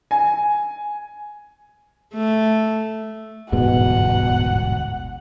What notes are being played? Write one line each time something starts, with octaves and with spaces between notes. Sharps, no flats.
G#5
A3
D1 G1 E2 G#2 B2 G#3 F#5